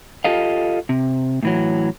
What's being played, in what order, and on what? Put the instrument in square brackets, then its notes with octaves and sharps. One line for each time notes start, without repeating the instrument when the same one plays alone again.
[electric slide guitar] F4 G4 A4 D#5 F5
C3
A2 E3 F#3